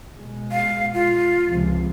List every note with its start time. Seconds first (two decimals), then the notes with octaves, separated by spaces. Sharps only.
0.17 B2 G#3
0.51 F5
0.94 F4
1.47 C#2 C3 F3